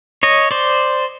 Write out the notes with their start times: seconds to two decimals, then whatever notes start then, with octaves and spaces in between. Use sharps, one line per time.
0.23 C#5 D#5
0.51 C5 D5